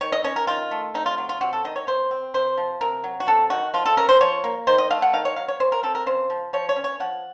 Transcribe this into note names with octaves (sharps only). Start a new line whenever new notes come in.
D#3 C#5
D#5
C#4 C#5
A#4
D#3 F4
A3
C3 D#4
F4
F#3
F4
C3 F#4
A4
D#3 D#5
C#5
C3 C5
C4
C3 C5
F3
C3 A#4
F#3
F#4
C3 A4
D#3 F#4
F3 F4
A4
C#4 A#4
C5
F3 C#5
A#3
D#3 C5
D#5
A3 F5
F#5
D#3 F5
C#5
F#3 F5
C#5
C#3 C5
A#4
C4 A4
A#4
C#3 C5
F3
F3 C#5
C#5
C#4
C#5
F3 F#5